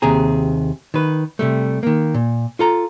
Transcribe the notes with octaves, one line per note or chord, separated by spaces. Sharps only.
D#2 C3 G4 G#4 A#5
D#3 B4
C3 G3 A3
D#3 A#3
A#2
F4 A4 A#5